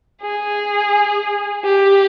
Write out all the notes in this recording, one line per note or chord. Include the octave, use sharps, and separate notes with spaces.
G#4
G4